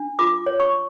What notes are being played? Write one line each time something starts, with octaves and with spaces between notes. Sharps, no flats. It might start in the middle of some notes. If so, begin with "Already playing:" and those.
Already playing: D4
F4 D6
C#5
C#6